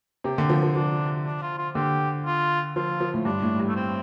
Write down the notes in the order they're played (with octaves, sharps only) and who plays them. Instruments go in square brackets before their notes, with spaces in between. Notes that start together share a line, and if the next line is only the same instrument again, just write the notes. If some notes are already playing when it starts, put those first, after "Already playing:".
[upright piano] C3 [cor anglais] G4
[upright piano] D3
F3
F3
[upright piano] F3 [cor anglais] D4
[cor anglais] D4
F4
F4
[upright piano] D3 [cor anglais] G4
[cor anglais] F4
[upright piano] F3 [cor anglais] F4
[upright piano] F3
A2
[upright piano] G2 [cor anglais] D4
[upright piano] A2
G2
[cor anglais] A3
C4